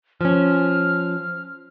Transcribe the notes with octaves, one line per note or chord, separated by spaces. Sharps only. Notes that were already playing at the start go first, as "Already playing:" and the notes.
F3 C#4 F6